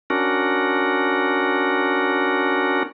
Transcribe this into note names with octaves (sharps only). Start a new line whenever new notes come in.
C#4 D4 F#4 A#4